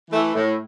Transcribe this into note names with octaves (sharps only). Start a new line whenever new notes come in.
E3 A3
A2